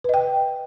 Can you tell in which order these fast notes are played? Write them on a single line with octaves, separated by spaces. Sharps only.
B4 D#5 G5